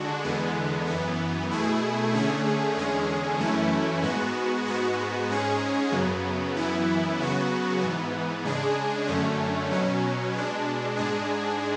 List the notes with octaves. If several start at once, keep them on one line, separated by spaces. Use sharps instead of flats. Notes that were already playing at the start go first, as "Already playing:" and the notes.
Already playing: D3 G#3 D4 F#4
E2 D3 G#3 B3
F#2 E3 B3
B2 A3 E4 G#4
D3 A3 C#4 G#4
E2 D3 G#3 C#4 G#4
F#2 E3 A3 C#4 E4
G#2 G#3 B3 F#4
G#2 G#3 B3 F#4
G#2 G#3 C#4 G#4
F#2 C#3 F#3 B3
F#2 E3 B3 E4
C#3 F#3 B3 F#4
G#2 E3 B3
C#3 G#3 D4 G#4
F#2 D3 A3 C#4
B2 F#3 C#4
B2 G#3 D4
G#2 G#3 D4 G#4